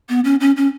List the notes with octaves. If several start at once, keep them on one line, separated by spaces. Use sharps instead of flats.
B3
C#4
C#4
C#4